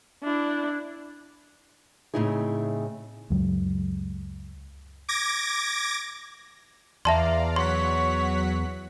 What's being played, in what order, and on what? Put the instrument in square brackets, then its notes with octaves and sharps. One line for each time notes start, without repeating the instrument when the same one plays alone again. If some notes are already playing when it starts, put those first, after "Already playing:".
[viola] D4 E4
[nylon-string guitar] A2 C#3 C4 D#4 E4 G#4
[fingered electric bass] C#2 F#2 F#3 G#3
[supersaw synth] D6 G#6 A#6
[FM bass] E2 [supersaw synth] D5 F5 A#5 [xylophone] E5 A5 C6
[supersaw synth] F#3 F#5 B6 [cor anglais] C#5 [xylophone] C6